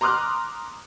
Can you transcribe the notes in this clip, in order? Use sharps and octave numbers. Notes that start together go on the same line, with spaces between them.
A#5 C6 D6 D#6 F6 F#6